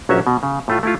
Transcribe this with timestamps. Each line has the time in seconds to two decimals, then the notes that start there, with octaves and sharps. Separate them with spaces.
0.09 A#1 F#3 C#4 F#4 C#5 E5
0.27 B2
0.43 C#3
0.68 A2 A3 F4
0.83 A3 E4 F4